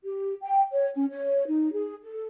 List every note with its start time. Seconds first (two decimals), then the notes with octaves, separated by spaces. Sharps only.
0.04 G4
0.42 G5
0.73 C#5
0.95 C#4
1.10 C#5
1.47 D#4
1.73 G#4
2.03 A4